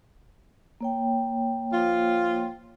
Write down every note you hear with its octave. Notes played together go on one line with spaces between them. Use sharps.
A#3 C#5 G5
F3 F4